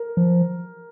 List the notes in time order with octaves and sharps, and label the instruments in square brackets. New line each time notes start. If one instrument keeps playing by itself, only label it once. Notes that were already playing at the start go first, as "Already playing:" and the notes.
Already playing: [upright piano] A#4
[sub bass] F3